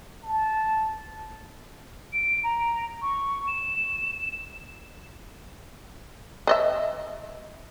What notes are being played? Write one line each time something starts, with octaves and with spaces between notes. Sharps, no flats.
A5
D7
A#5
C#6
E7
B4 D#5 E5